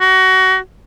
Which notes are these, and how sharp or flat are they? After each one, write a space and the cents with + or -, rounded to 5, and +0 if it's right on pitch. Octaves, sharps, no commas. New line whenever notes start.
F#4 +25